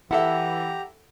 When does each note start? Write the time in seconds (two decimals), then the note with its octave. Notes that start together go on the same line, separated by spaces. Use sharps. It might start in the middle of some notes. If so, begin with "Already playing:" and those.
0.11 E3 E4 G4 A4 E5 F#5 A#5